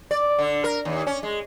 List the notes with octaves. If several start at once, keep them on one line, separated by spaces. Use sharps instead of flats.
D5
D3
A#4
D#2
C#4
G#3